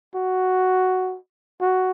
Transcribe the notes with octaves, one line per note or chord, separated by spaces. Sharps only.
F#4
F#4